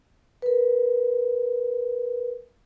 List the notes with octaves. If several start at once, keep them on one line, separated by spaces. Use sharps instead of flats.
A#4 B4